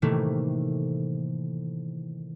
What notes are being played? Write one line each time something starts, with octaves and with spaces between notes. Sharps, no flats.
A2 C3 D#3 E3 A3 A#3